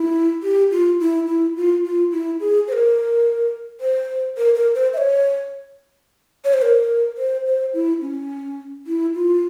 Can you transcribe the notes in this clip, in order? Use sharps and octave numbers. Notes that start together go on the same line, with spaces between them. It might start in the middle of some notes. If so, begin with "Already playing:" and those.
Already playing: E4
G4
F4
E4
E4
F4
F4
E4
G#4
C5
A#4
C5
A#4
A#4
C5
E5
C#5
C#5
C5
A#4
C5
C5
E4
C#4
E4
F4